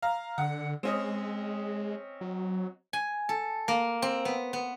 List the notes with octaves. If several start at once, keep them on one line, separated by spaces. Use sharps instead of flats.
F5 A#5
D3 F#5
G#3 C4 C#4 D#5
F#3
G#5
A4
A#3
C4
B3
B3